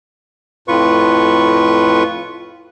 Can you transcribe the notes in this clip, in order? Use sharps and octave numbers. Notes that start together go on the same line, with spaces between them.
F2 A2 F4 B4 C#6